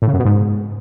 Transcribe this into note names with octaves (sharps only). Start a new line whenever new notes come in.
A2
C#3
F#2
B2
G#2